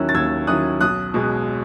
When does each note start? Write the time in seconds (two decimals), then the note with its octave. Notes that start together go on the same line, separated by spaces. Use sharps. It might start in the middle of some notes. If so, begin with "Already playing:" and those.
Already playing: D#2 D#3 F#3 C#4 E4 E6 F#6
0.09 A6
0.14 D#2 E6 G#6
0.47 D#3 F#3 C#4 E4 D#6 F#6
0.81 B1 D#6 F#6
1.14 B2 G#3